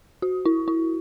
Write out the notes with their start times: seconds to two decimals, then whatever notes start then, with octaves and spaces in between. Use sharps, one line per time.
0.22 F#4
0.45 E4
0.68 E4